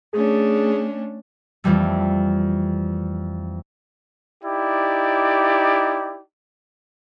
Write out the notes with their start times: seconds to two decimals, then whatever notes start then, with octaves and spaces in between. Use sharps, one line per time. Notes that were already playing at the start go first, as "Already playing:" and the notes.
0.13 A3 C#4 D4 G#4
1.64 F2 E3 G3 A3
4.44 D#4 E4 G4 D5